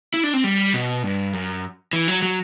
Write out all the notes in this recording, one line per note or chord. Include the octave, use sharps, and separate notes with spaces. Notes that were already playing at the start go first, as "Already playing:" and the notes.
E4
D4
C4
G3
B2
G2
F#2
E3
F#3
F#3